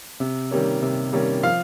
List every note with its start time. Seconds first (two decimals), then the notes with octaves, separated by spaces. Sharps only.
0.20 C3
0.51 D#3 G3 A#3 C#4
0.82 C3
1.13 D#3 G3 A#3 C#4
1.43 F3 F5